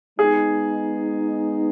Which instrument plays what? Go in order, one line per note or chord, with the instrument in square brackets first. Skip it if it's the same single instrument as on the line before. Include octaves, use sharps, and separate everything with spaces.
[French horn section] G#3 B3 D#4 [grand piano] G#4